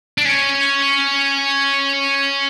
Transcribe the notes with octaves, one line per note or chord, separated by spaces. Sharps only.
D4
C#4